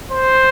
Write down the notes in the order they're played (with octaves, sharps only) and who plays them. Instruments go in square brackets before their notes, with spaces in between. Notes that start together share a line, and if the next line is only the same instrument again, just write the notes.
[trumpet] C5